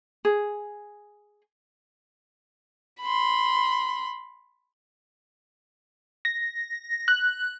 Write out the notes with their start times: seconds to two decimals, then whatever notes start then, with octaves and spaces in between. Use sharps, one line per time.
0.25 G#4
3.01 B5 C6
6.25 A#6
7.08 F#6